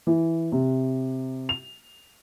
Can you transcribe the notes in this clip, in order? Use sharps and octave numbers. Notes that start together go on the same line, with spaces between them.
E3
C3
F7